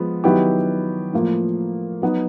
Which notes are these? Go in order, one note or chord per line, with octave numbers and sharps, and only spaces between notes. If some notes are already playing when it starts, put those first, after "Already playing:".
Already playing: F3 G#3 B3
D#3 F#3 B3 E4 G4
A2 F3 A#3
F#3 B3 D#4